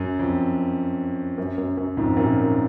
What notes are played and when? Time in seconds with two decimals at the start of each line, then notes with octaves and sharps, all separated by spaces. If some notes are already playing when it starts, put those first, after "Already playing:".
Already playing: F#2
0.19 F2
1.38 F#2
1.58 F#2
1.77 F#2
1.97 F2 G#2
2.16 F#2 A#2